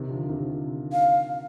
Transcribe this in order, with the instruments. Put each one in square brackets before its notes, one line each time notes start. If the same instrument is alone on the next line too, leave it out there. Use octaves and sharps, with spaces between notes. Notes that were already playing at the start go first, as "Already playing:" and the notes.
Already playing: [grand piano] C3 D#3
D3 F3
C3 D#3
[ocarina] F5